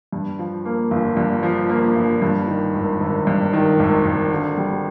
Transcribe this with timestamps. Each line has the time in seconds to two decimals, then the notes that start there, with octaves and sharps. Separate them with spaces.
0.12 G2
0.39 F3
0.65 A#3
0.91 G1
1.17 G2
1.43 F3
1.69 A#3
1.96 G1
2.22 G2
2.48 D#3
2.74 G#1
3.00 G#1
3.27 G2
3.53 D#3
3.80 G#1
4.05 G#1
4.32 D3
4.58 G3